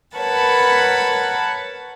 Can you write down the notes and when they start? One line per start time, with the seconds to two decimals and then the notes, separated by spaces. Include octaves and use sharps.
0.16 A#4 B4 C#5 F#5 A5 B5